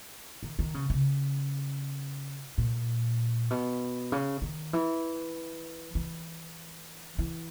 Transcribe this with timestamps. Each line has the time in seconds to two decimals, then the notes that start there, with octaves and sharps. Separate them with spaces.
0.43 D#3
0.59 D#3
0.74 C#3
0.90 C#3
2.58 A#2
3.51 B2
4.12 C#3
4.42 D#3
4.73 E3
5.95 E3
7.19 E3